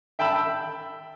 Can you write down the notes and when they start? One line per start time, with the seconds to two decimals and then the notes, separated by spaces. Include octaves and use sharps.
0.19 E5 G5 A5 B5 E6